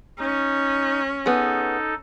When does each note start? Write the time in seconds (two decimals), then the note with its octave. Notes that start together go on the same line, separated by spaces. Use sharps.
0.19 C#4 D#4
1.26 B3 D#4 G#4 A4